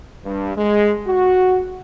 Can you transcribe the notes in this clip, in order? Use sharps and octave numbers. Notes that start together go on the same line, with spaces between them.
G2
G#3
F#4